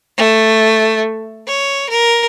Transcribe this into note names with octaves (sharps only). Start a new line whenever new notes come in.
A3
C#5
A#4